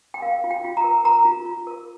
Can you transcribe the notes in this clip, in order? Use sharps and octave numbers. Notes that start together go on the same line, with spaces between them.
G5
A#4 F5
F4
G5
F4
A#5
A#4
A#4 A#5
F4
F4
A#4